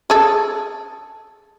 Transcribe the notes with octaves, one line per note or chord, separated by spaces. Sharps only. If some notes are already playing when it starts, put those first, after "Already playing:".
G#4 A4